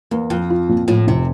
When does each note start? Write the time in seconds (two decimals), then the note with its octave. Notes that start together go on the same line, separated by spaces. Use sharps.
0.11 E2 A#3
0.30 F2 F3
0.50 F4
0.69 A#2
0.88 A2 F3
1.08 F1 C3